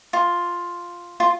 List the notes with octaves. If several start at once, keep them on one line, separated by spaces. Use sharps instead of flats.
F4
F4